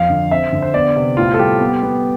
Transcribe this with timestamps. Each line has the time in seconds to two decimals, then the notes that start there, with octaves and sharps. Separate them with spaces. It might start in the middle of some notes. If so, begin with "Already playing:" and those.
Already playing: F2 F5
0.10 D3
0.31 C4 E5
0.53 D3
0.62 C5
0.74 B3 D5
0.96 C3
1.17 A2 F4
1.34 A4
1.39 G3 G4
1.60 B3
1.83 B3